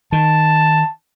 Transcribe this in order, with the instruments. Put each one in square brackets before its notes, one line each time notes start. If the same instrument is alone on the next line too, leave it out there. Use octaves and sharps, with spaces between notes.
[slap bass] D#3 [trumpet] A5